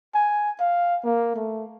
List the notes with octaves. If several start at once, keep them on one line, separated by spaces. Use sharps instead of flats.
G#5
F5
A#3
A3